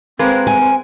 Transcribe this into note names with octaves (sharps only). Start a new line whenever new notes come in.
G#3 A#3 C4 B4
G#5